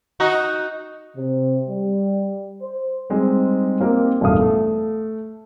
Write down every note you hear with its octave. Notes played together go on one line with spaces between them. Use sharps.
D#4 F#4
C3
G3
C5
G3 G#3 C4 D#4
A#3 C4 D#4 G4 A#4 C5
E1 A1 G2 A3 F5 D#6
A3